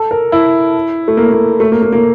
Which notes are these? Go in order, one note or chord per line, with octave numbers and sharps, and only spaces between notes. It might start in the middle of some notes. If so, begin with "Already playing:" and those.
Already playing: A4
A#4
E4
A3
A#3
A#3
A3
A#3
A#3
A#3